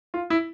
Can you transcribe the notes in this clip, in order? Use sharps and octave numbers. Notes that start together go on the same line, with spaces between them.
F4
E4